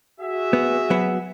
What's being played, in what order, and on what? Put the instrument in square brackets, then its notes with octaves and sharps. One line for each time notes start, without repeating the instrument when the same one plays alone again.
[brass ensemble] F#4 G#4 E5
[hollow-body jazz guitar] B3
F#3 B3